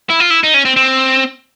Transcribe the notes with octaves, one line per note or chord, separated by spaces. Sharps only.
E4
F4
E4
D#4
C#4
C4
C4